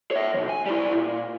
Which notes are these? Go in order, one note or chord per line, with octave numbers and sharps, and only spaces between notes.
C#5 E5
B1 F3
G#5
G3 E4
A#2